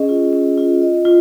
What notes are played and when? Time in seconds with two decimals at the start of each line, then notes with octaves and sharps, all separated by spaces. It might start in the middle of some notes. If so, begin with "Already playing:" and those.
Already playing: C#4 G#4 D#5
0.09 F4
0.33 C#4
0.58 F4
0.82 D#5
1.05 F4